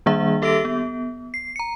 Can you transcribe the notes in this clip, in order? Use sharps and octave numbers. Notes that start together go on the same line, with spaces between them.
D#3 G3 A#3 D4 G#4 E5
G4 A4 E5 E6 A#6 D7
B3
C7
A#5 C#7